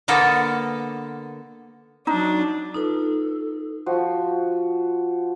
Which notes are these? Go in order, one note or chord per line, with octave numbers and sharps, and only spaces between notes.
D3 A#3 B3 A4
F#3 D4 D#4
D#4 F4 A4 B4
F3 F#4